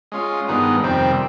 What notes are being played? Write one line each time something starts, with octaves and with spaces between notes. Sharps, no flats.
G#3 C#4 F4
G2 D#3 G#3 B3 D#4
F2 C3 D#3 G3 C4